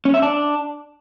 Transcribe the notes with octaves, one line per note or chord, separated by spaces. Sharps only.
C#4
E5
D4